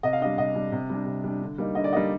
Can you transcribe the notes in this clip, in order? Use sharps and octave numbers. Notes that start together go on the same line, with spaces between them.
C3 D#5
F5
G3 D4 D#5
C3 D#5
G3 D4
C3
G3 D4
C3
G3 D4
D3
G3 A#3 D#4
D3 D#5
D5
G3 A#3 D#4 D#5